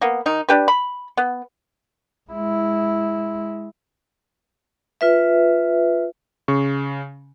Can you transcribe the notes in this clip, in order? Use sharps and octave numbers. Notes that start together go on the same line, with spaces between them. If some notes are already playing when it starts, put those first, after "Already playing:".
A#3 B3
D#3 D#4
D4 G4 B4
B5
B3
G#3 E4
F4 B4 E5
C#3 C#6